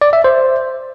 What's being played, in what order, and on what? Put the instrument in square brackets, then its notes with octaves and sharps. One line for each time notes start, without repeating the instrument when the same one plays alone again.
[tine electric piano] D5
E5
C5